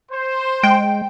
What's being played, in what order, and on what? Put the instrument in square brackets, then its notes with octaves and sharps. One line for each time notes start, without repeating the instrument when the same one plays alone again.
[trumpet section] C5
[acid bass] G#3 [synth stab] G5